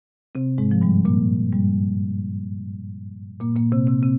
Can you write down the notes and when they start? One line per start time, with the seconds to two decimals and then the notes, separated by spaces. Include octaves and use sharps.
0.35 C3 C4
0.58 G#2 G#3
0.71 F3
0.82 G2 G3
1.05 A#2 A#3
1.53 G2 G3
3.40 A#2 A#3
3.56 A#2 A#3
3.72 C3 C4
3.87 C3 C4
4.03 C3 C4